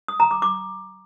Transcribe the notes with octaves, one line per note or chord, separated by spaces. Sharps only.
D#6
A#5
D6
D6